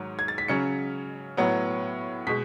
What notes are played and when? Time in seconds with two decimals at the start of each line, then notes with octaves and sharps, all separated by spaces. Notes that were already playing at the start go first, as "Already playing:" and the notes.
Already playing: G#2 D#3 F#3
0.19 G#6
0.28 A6
0.38 B6
0.48 C#3 F#3 C#4 C#7
1.37 A2 F#3 B3
2.27 B2 G#3 B6